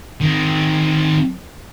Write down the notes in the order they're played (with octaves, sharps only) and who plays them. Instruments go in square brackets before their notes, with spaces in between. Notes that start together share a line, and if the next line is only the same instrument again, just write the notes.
[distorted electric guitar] D#3 C4